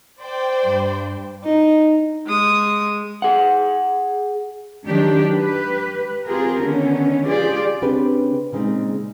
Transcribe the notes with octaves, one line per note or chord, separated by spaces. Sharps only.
C5 D5 G5
G2
D#4
G#3 D#6
G#4 F#5
D#3 F#3 D4 G4
G4 B4
C4 F4 G4 G#4 A#4
D3 D#3 B3 C#4
F4 G4 G#4 D5
C#3 C4 D4 G4 G#4 B4
A#2 C#3 G#3 C4 D#4